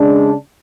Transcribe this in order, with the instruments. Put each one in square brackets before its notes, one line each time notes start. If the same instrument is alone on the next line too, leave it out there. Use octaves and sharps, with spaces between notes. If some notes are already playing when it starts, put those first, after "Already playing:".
Already playing: [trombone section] C#3 G#3 D4